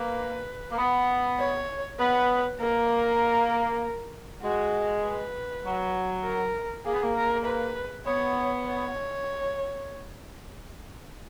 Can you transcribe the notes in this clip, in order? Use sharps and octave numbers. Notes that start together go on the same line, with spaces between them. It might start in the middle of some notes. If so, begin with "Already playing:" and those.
Already playing: A#3 B4
A#3
B3
C#5
B3 B4
A#3 A#4
G#3 F#4
B4
F#3
A#4
A#3 G#4
B3
A#3
A#4
B4
B3 C#5
C#5